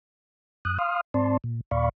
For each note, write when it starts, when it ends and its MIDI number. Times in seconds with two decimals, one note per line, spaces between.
0.65 0.78 42
0.65 0.78 87
0.65 0.78 90
0.79 1.01 77
0.79 1.01 84
0.79 1.01 87
0.79 1.01 89
1.14 1.37 44
1.14 1.37 60
1.14 1.37 74
1.14 1.37 81
1.14 1.37 84
1.44 1.61 46
1.71 1.89 39
1.71 1.89 46
1.71 1.89 74
1.71 1.89 77
1.71 1.89 83
1.71 1.89 85